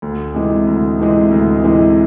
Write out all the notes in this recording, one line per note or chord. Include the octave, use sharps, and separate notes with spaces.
D2
C3 E3 G#3
D2
C3 E3 G#3
D2
C3 E3 G#3